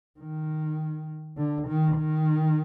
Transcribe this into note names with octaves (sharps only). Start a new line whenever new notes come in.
D#3
D3
D#3
D#3